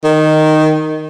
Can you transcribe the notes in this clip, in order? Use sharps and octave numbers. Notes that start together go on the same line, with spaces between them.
D#3